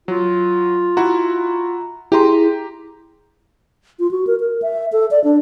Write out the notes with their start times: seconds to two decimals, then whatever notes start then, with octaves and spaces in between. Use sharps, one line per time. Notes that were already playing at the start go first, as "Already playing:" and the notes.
0.08 F#3 F4
0.97 E4 F#4 A#5
2.12 E4 G4 G#4 A#5 C6
3.99 F4
4.11 F#4
4.27 A#4
4.40 A#4
4.62 E5
4.92 A4
5.11 D5
5.24 D4